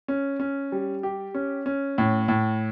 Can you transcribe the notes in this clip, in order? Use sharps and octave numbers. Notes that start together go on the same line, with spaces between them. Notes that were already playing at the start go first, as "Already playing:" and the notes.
C#4
C#4
G3
G4
C#4
C#4
A2
A2